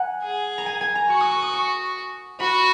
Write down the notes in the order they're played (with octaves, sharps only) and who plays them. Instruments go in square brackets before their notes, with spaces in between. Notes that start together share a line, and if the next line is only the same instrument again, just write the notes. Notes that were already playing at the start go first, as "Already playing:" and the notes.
Already playing: [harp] F#5 G#5 A#5
[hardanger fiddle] G#4
[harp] A#5
G#5
G#5
A#5
[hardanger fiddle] F#4 [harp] C#6
[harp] D#6
C#6
D#6
C#6
[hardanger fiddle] F#4 [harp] B5